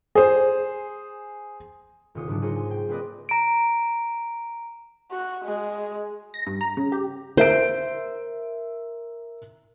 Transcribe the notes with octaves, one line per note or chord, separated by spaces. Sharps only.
G#4 C5
D#1 C3 F4 C#5 D#6
G#2 C#3 F#3 D4 F4
D#4 F4 G#4 C5 C#5
G#5 C6
G5
A#3 C4 G#4 B4 D5 D#5
A#5 D7
F#4
G#3
A#6
G2
A#5
C#3
G4
A#4 C5 E5 D7